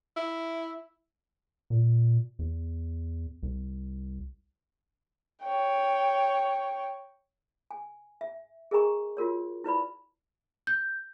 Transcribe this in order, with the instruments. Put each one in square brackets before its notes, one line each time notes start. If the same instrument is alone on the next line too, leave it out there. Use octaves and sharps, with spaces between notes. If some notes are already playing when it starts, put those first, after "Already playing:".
[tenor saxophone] E4
[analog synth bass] A#2
E2
C2
[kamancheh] C#5 G5
[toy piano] G#5
E5
G#4 A#4 D#5 G#5 A#5 C#6
F4 F#4 A#4 C#5
E4 B4 D5 B5
[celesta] G6